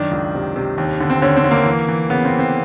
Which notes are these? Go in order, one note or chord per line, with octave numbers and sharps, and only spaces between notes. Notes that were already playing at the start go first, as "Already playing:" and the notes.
Already playing: F#2 D#3 D4
C#2
C3
C3
D#2
D3
C4
D3 C#4
C4
D3
A#3
E3
E3
C#3 B3
C4
E3
C4